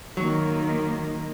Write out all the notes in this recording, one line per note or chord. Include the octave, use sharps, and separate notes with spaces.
D#3 F#3 A#3